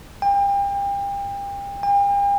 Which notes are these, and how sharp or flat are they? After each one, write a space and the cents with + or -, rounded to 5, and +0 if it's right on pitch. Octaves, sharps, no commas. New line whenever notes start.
G5 +35
G5 +45